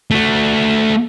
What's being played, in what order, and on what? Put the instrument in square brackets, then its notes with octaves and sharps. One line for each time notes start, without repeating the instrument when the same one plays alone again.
[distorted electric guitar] A3 F#4